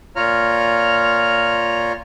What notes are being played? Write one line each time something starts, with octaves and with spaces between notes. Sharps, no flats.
A#2 F4 C#5 A#5 F6